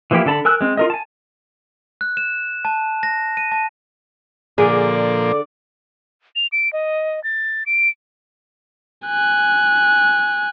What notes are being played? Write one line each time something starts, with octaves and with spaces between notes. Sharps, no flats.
E3 F3 A#3 E4 G4
D3 A4 A5 B5
A#4 G#5 E6 F#6
G#3 C4
F4 A#4 D#5
G#5 A5
F#6
E7
A5
A#6
D#7
A5
A#2 D3 F3 A#3 G#4 D5
F7
D7
D#5
A6
D7
G#5 F#6